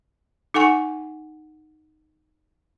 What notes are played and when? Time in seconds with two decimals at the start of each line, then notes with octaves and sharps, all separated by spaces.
0.54 D#4 A4 F#5 G#5 C#6